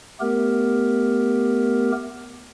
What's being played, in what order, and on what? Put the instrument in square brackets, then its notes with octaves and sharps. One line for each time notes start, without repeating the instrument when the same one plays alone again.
[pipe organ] A3 B3 G4 A#4